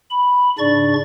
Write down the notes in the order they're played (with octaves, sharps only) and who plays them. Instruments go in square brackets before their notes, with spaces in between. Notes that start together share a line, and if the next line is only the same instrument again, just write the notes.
[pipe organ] B5
G#2 C#3 D4 D5 C#6 A6